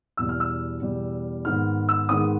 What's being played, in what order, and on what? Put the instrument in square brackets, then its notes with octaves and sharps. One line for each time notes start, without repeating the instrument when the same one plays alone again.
[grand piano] E2 B2 G3 E6
F6
E6
E2 B2 G3
G#2 D#3 G#3 B3 F6
E6
G#2 D#3 G#3 B3 D#6